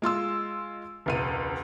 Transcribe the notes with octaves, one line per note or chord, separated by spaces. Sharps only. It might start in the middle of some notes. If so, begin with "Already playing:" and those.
G#3 F4 C6 E6
E1 C#2 D#7